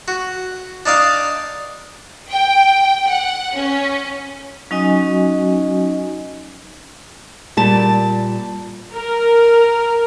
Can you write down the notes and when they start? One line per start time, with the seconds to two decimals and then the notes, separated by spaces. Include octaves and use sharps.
0.08 F#4
0.86 D4 D#4 D5 F5
2.31 G5
3.08 F#5
3.55 C#4
4.71 F#3 C#4 D#4 F#4 D#5 G#5
7.57 A#2 G3 A5
8.93 A#4